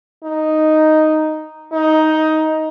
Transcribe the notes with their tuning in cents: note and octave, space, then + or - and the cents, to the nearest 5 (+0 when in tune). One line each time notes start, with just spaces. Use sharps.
D#4 +0
D#4 +10